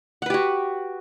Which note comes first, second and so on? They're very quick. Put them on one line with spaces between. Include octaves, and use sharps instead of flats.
F#5 B4 G4 F#4